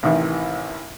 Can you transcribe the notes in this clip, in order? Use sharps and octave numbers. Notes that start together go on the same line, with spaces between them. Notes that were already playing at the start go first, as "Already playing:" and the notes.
A1 C3 D#3 E3